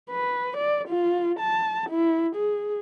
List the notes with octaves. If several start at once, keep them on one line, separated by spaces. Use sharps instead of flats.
B4
D5
F4
A5
E4
G#4